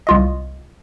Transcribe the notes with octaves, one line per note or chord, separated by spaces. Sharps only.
C2 F4 D#5